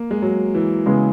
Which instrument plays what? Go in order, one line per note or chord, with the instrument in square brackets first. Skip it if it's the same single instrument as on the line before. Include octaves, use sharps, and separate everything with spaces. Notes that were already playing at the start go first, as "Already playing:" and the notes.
Already playing: [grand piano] A#3
G#3
F#3
E3
[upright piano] C#3 G#3 B3